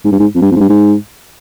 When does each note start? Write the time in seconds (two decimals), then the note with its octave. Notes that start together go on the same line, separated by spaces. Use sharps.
0.04 G#2
0.12 G2
0.19 G#2
0.35 F2
0.41 G2
0.51 F2
0.56 G#2
0.60 G2
0.69 G#2